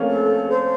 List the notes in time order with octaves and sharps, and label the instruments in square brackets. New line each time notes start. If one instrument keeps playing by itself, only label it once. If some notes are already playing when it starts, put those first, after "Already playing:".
Already playing: [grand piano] F3 A3 A#3 C4 C#4
[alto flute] A4
C5